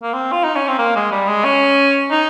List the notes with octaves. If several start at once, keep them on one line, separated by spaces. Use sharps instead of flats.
A#3
C4
F4
D#4
C#4
C4
A#3
G#3
G3
G#3
C#4
D#4